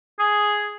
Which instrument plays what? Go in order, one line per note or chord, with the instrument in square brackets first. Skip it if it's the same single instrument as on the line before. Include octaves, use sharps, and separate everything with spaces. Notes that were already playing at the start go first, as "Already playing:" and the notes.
[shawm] G#4